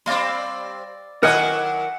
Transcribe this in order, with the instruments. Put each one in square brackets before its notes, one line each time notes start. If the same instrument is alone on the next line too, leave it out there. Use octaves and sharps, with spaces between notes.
[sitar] G3 C4 [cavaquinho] D5 F5 C6
[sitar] D#3 F#3 E4 [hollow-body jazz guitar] A#4 D#5 G#5 [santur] F#5 [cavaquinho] D6